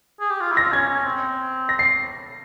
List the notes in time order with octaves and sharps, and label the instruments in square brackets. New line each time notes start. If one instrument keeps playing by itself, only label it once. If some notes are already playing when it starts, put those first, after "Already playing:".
[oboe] G#4
G4
F4
E4
[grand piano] A#6
[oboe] F4
[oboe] C#4 [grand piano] G#6
[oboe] C#4
C4
[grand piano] A#6
C7